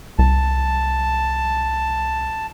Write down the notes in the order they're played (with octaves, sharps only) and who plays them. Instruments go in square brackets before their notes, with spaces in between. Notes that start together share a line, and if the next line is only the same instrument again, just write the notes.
[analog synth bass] C2 [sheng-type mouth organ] A5